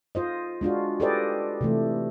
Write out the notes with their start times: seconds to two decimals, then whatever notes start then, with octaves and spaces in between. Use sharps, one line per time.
0.15 F4 C5 D#5
0.61 G#3 D4 F4 F#4
1.00 G4 A4 B4 C5 D5 D#5
1.61 C3 E3 A3